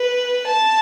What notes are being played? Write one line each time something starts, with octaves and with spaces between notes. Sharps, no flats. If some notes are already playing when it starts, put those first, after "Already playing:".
Already playing: B4
A5